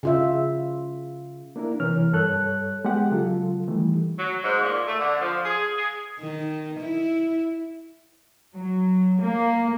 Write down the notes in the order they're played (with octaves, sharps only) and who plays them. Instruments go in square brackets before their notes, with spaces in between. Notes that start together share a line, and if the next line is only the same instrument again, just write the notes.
[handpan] C#3 F4 E5
[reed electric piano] A#3 D4 E4 A#4
C3 E3 A#4 C#5 F6
G2 G3 A4 C#5 F#6
G#3 B3 G4 F#5
C#3 F#3 F4 A4
D#3 E3 G3 A3
[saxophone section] F#3
G#2
A#2
A3
D3
F3
G#4
G#4
[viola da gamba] D#3
E4
[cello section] F#3
A#3